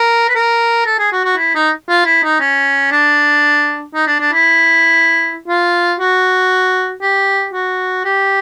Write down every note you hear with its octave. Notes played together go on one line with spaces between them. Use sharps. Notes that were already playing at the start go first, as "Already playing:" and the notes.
Already playing: A#4
B4
A#4
A4
G#4
F#4
F#4
E4
D#4
F4
E4
D#4
C#4
D4
D#4
D4
D4
E4
F4
F#4
G4
F#4
G4